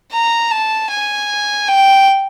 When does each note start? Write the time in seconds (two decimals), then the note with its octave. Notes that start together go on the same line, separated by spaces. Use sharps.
0.12 A#5
0.51 A5
0.90 G#5
1.68 G5